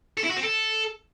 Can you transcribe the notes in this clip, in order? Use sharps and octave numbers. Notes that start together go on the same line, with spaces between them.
A4
E4
F#4
C4
A4